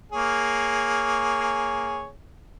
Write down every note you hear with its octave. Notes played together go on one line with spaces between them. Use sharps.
A#3 G#4 C#5